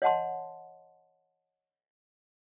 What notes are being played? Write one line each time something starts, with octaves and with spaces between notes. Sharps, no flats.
C#5 D#5 F#5 A5 C6